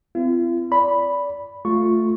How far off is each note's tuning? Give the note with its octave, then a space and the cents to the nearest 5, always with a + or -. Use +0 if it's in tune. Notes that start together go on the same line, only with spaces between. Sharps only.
C4 -40 F4 -45
D5 -25 B5 +0
A3 +0 F4 +10 C#6 +0